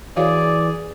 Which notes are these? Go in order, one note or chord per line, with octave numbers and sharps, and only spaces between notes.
E3 F#4 G#4 C#5 D5 F5